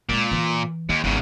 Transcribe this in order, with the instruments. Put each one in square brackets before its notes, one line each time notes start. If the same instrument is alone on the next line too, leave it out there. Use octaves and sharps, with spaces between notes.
[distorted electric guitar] A#2 [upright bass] G#3 C4
[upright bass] E3
[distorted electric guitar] D#2 [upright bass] E4
[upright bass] G#1 [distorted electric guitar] E2 C#3